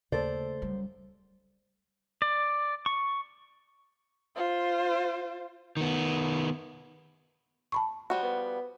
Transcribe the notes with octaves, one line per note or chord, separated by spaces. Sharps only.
D#2 C#3 A3 A4 C5 D5
F#2 G3
D5
C#6
F4 C5
D#3 B3
A5 B5 C#6
F3 G3 F#4
B3